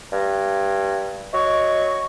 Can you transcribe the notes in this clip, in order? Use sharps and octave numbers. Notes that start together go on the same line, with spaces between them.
G2
F#3 D#5 C#6